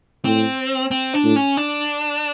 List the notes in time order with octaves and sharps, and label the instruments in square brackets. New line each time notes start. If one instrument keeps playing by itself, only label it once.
[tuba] A2 [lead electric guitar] C4
[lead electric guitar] C4
D4
[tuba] A2
[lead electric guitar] C#4
D4